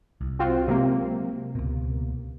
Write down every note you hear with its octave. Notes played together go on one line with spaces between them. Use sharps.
C2
C4 F4 F#4
C3 F#3 G#3 A#3
C#2 B2